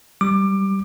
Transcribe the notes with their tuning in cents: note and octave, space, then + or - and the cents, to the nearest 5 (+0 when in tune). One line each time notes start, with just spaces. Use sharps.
G3 -10 D6 +20